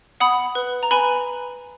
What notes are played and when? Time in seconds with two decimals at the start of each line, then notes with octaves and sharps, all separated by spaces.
0.20 F#5 B5 D#6
0.55 B4
0.83 A#5
0.91 B4 G#5 B5